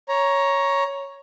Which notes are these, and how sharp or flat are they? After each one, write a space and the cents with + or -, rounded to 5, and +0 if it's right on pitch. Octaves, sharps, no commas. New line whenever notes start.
C#5 +0 A#5 +15